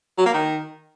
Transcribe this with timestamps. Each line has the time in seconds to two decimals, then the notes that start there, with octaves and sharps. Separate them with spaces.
0.18 F#3
0.26 A#3
0.33 D#3